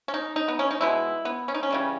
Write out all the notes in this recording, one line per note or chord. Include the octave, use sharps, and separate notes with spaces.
C#4
D#4
D#4
B3
C#4
D#4
B2 G#3 B3 E4
B3
C#4
D#4
C#4
C#3 E3 G3